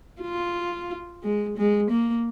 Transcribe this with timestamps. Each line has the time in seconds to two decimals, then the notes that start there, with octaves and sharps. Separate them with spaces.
0.22 F4
1.23 G#3
1.57 G#3
1.90 A#3